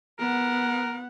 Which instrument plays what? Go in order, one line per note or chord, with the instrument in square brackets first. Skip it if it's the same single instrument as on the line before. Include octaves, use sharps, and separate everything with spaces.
[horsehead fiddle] B3 F#5 [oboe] A#4